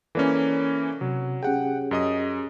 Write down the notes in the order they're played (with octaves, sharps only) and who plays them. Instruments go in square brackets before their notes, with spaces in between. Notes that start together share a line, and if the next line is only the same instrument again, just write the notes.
[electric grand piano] E3 A#3 C#4 [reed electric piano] A4 D5
[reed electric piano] C3 [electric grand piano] F#3
[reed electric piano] C#4 G4 G#4 [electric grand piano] F#5 G5
[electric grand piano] F#2 D#5 D#6